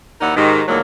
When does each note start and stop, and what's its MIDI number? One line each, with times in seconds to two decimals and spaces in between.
0.21 0.33 39
0.21 0.33 63
0.21 0.33 64
0.21 0.33 70
0.21 0.33 74
0.21 0.33 78
0.36 0.62 44
0.36 0.62 51
0.36 0.62 67
0.68 0.80 39
0.68 0.80 45
0.68 0.80 50
0.68 0.80 54
0.68 0.80 56
0.68 0.80 58